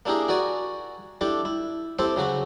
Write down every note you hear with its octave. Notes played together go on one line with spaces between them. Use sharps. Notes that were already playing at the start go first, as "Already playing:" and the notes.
A#3 D4 E4 G4 G#4 A#4
F#4 A#4 D5 G#5
D4 E4 G4 A4
E4
C4 E4 G4 A4 C5
C#3 F#3 F#4 D6